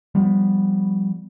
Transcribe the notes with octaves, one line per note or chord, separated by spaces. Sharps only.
F3 G3 B3